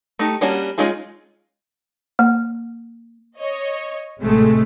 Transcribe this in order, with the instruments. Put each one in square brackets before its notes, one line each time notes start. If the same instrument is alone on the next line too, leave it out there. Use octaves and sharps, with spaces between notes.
[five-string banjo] A3 D#4 G4
G3 A#3 C#4 D4 F#4
G#3 C#4 D#4 F4 G#4
[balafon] A#3
[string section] C#5 D#5
A1 G#2 C3 G#3 A3